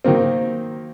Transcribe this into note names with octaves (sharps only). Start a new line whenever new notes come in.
D#3 F#3 A#3 C4